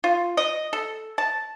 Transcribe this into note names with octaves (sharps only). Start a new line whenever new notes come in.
F4
D#5
A4
A5